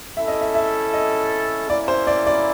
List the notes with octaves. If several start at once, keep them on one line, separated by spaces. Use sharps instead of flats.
C#4 E4 A4 E5
D#5
E5
E5
D#5
A#3 C#4 E4 D5
C5
D5
D5